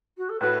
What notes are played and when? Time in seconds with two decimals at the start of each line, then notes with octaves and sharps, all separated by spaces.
0.17 F#4
0.29 A4
0.40 A2 A3 F#4 B4